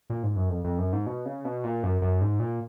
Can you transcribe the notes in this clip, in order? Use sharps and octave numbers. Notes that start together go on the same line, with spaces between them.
A#2
G#2
F#2
F2
F2
F#2
G#2
B2
C#3
B2
A#2
F#2
F#2
G#2
A#2